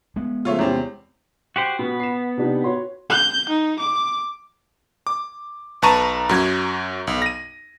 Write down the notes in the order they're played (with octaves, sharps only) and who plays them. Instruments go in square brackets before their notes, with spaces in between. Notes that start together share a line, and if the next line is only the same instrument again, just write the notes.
[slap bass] G#3 B3
[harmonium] C#3 F3 A3 [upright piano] F4 C#5 E5
[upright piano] E2 C4 [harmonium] C3 C#4
[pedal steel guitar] F#4 G4 C5
[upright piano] B2 [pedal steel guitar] B3
[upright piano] C7 E7
C3 D4 D#4
F#4 C#5 C6
[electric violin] G6
D#4
D6
[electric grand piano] D6
B1 B4 A5 A#5 C#6 D#7
F#2 F#3 G#6
B1
A#6 D#7